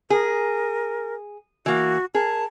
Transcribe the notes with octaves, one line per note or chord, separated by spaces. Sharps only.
G#4 A#4
E3 A#3 F#4
G#4 A#4 A5